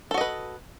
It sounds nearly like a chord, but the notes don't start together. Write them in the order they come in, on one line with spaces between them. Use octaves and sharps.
A4 F#4 D#5 B4